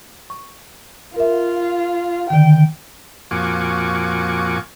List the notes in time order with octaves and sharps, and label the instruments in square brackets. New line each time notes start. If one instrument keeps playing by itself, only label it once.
[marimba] C#6
[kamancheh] F4 [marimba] A#4 E5
[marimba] D3 D#3 [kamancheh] G5
[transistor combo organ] F2 A#2 F#4 G#5 C#6 D6